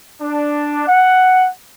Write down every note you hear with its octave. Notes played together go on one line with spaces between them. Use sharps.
D4
F#5